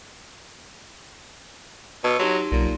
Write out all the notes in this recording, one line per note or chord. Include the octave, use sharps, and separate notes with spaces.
B2 A5 E6 G#6
F#3 D#4 G4 C6
B1 A#2